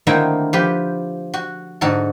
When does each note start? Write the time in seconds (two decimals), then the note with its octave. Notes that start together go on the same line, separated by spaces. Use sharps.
0.07 D3 D#3 A3 A#3 C4 E4
0.53 F3 G4 B4
1.34 F#4
1.81 G#2 D3 F#4 A4